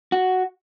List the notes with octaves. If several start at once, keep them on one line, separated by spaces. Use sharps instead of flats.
F#4